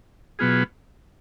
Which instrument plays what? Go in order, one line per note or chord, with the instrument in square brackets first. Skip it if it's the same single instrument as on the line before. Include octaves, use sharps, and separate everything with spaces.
[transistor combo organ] B2 F#3 B3 F4 G#4